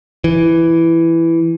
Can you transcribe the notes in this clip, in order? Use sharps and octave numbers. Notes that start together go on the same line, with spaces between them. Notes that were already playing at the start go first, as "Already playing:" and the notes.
E3